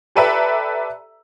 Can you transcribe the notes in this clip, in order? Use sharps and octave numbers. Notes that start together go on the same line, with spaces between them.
G4 A4 B4 D5 E5 A#5